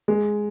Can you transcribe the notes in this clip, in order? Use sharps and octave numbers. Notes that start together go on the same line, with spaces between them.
G#3